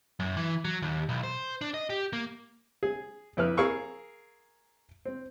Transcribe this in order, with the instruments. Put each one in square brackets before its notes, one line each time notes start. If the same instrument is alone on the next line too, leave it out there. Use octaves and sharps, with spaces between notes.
[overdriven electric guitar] F#2
E3
F#3
D#2
B1
C5
D4
D#5
G4
A#3
[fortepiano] G#4
F2 E4 B4 F6
G#4 A#4 F5 C#6 E6
C4